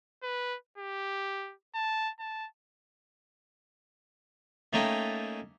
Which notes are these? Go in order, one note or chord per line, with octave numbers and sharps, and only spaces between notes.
B4
G4
A5
A5
A3 A#3 C#4 D#4 G5